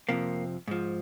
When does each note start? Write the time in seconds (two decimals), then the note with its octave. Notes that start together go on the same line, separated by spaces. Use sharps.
0.09 F2 C3 F3 A#3
0.68 G#2 F3